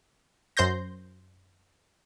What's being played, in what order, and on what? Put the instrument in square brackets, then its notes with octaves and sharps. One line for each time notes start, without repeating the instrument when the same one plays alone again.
[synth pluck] F#2 C5 C6 G6 A#6